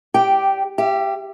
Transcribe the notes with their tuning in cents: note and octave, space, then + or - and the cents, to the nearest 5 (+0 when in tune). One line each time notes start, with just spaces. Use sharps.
G4 +0 D5 +0 G5 -15
G4 +0 E5 +45